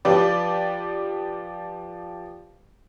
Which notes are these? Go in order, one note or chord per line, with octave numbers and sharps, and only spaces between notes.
F3 G4 B4 D5